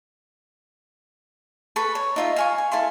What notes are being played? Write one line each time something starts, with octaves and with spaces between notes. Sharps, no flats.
A4 B4 C#6
C#5
D#4 F4 E5
F5 G#5 C#6
G#5
E4 A4 F5 C6